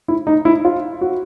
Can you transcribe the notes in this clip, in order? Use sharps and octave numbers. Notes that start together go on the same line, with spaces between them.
E4
D#4
E4
F4
F#4